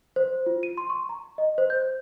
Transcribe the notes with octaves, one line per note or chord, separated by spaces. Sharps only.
C5
F4
D#7
C6
C#6
A#5
D#5
C5
G6